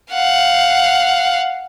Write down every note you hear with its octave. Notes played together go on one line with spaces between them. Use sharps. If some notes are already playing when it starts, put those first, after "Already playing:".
F5 F#5